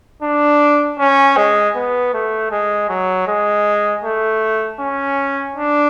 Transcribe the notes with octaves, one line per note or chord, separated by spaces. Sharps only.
D4
C#4
G#3
B3
A3
G#3
F#3
G#3
A3
C#4
D4